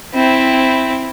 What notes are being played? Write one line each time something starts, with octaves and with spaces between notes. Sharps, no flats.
C4 E4